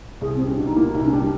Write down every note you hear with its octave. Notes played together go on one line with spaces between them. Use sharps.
C2 G#4
G3 C4
C#4
B2 D4
D#4
A#3 E4
C2 D#4
C#4
G3 D4